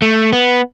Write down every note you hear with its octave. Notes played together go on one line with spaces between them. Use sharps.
A3
B3